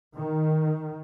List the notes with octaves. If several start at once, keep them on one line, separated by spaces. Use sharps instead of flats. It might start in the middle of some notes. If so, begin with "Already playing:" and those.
D#3